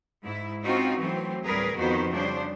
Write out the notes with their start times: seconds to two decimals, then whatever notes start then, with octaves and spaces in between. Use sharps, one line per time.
0.22 G#2 E4
0.63 C4 C#4 D#4 F4 F#4
0.98 E3 F#3 A3 C4
1.44 D2 A2 G3 G#4 A#4 B4
1.75 F2 D#3 F3 B3 F#4 C5
2.11 C#3 G3 D4 C5